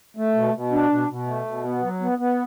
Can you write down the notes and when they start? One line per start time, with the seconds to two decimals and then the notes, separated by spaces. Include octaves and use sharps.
0.17 A3
0.35 B2
0.54 B2
0.72 D4
0.90 B2
1.09 B2
1.27 A3
1.45 B2
1.64 B3
1.82 F#3
2.01 B3
2.18 B3